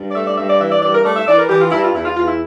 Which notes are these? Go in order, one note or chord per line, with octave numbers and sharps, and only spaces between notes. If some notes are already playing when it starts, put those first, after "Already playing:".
Already playing: G2
D5
A3 E5
D5
G2 E5
D5
E3 E5
D5
G2 D5
A#4
A3 D5
E5
E3 D5
A#4
E3 G4
F4
G2 E4
F4
E2 E4
F4
E2 F4
E4